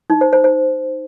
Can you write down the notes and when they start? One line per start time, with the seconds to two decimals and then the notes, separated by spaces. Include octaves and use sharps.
0.10 D#4
0.21 C5
0.33 C5
0.44 C5